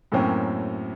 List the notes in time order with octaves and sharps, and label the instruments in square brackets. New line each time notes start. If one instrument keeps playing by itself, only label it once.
[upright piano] F#2 A2 F#3 A#3 C4 C#4